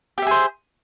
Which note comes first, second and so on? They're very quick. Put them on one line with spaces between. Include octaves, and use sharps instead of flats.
G4 E5 G#4 C5